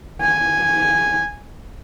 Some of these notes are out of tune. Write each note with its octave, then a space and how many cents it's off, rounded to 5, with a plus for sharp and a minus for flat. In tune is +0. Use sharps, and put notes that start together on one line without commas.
G#5 -5